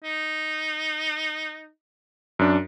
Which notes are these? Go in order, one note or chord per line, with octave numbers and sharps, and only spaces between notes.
D#4
F#2 D4